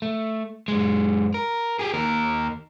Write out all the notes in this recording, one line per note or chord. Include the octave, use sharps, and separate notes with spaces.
A3
F#2 G#3
A#4
G4 G#4
D#2 A#4